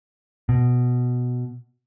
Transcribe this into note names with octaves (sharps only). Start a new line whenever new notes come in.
B2